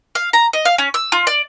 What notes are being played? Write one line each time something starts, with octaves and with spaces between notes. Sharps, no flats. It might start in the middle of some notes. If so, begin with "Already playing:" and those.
F5
A#5
D#5
F5
C#4
E6
F4
D5